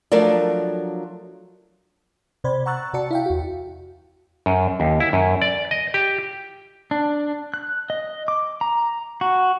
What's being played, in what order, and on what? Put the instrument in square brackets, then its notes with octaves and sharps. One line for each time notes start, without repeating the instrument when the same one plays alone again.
[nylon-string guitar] F3 F#3 A3 D4 A#4 D5
[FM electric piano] C3 C5 D5 B5 G#6
F#5 A#5 C#6 E6 F#6 A6
C3 F#4 D5 A5 C#7
E4 F5 G5
E2 F#4
[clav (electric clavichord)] F#2
D#2
E4
F#2
D5
D#5
G4
[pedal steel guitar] D4
F#6
D#5
D6
A#5
F#4